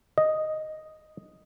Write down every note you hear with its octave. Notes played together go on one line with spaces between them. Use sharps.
D#5